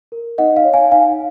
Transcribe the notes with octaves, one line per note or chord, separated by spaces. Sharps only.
A#4
D#4 D#5 F#5
F5
C#5
F5 G#5
D#4 F5 G#5